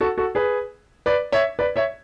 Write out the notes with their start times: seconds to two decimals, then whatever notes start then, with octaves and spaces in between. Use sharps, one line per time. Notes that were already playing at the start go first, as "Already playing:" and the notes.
0.01 F#4 A4
0.18 F#4 A4
0.35 G#4 B4
1.06 B4 D5
1.32 C#5 E5
1.59 B4 D5
1.76 C#5 E5